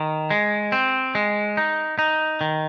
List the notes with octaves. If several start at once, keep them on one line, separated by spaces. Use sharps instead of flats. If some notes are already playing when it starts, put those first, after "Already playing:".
Already playing: D#3
G#3
C4
G#3
D#4
D#4
D#3